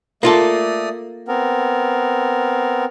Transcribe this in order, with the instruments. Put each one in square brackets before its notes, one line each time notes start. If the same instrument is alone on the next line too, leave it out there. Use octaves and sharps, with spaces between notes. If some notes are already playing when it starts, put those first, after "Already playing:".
[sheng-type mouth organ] A3 D5 D#6 [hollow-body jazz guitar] A#3 F4 A4
[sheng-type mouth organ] B3 C4 A#4